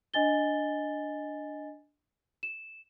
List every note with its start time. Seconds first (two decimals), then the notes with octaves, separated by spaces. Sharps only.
0.14 D4 D#5 G#5 A6 G7
2.43 E7